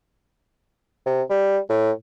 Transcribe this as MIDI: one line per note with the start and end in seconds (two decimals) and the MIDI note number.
1.06 1.22 48
1.30 1.58 55
1.69 1.91 45